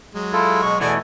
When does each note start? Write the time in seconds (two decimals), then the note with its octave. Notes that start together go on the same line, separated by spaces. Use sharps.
0.14 F#3 G#3
0.33 E4 F4 A4
0.62 B2 C#6
0.80 E2 B2 E3 A3 A4 D5 F#5 G#5